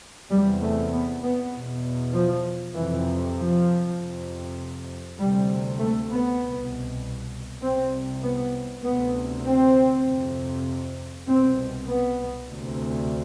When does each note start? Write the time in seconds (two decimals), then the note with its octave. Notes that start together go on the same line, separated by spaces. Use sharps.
0.30 E2 C3 G3
0.61 A3
0.92 B3
1.22 B3
1.53 E2 B2
2.13 F3
2.75 F2 C3 E3
3.36 F3
3.96 F2 C3
5.18 D2 C3 G3
5.79 A3
6.10 B3
6.40 C2 B2
7.62 C2 C3 C4
8.23 B3
8.84 D2 C3 B3
9.45 C4
10.06 F2 C3
11.28 C2 B2 C4
11.89 B3
12.49 D2 C3